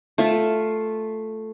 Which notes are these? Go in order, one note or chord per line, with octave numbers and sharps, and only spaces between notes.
A3 F4 E5